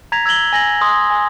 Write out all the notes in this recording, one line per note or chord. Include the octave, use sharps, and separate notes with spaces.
A#5 G#6 A#6 B6 F7
E6 G#6 A#6 F#7 G7
G#5 A#6 F#7
C6 D#6
G#5